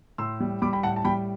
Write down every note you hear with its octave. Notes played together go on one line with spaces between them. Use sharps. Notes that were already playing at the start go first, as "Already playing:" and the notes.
A2 C6 E6
G3
G3 B5 D6
G5 B5
A2 F#5 A5
A5
G3 G5 B5